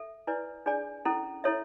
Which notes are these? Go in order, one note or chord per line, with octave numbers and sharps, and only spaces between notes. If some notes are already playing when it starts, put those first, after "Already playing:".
Already playing: A4 E5
E4 B4 D5 G#5
D4 G#4 D5 G#5
C#4 E4 A4
E4 A4 C#5 E5